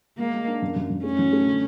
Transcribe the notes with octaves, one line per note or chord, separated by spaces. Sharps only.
G#3 A#3
G#3
D4
F#2
F#2
F#2
A3 C#4
F#3
A3
D3